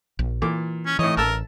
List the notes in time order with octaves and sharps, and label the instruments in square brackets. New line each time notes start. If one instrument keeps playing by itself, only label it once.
[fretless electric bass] A#1
[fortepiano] A#2 D6 [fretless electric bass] E3
[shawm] C#4
[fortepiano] A2 C#5 [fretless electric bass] E3 [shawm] D#5
[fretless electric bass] A1 [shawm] A#4 [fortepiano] A5 E6